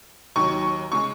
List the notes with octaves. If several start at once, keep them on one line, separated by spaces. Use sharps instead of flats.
D#2 D#3 F#3 C#6
C#3 G#3 C#6